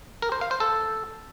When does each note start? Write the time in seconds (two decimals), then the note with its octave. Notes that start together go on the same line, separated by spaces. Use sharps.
0.22 A#4
0.32 C5
0.41 F5
0.51 C5
0.60 A4